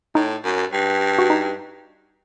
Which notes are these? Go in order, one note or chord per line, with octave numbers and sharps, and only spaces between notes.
A2 D#4
F#2
G2
F#4
D#4